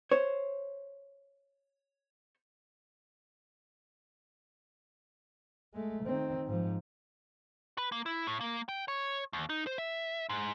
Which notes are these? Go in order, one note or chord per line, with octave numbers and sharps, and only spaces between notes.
C5 C#5
G#3 A3
D#3 C4
G#2 F3
B4
A#3
E4
A2
A#3
G5
C#5
D#2
D#4
C5
E5
G#2